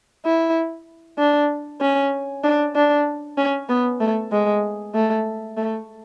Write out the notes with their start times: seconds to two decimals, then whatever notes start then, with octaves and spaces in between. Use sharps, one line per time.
0.25 E4
1.19 D4
1.81 C#4
2.44 D4
2.75 D4
3.38 C#4
3.69 B3
4.01 A3
4.32 G#3
4.94 A3
5.57 A3